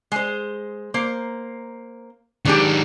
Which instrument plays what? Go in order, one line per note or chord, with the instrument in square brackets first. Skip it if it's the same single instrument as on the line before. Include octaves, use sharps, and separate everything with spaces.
[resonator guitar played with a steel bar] G#3 C5
A#3 C5
[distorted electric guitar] D#3 G#3 [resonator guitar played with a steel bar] F#3 D4 G4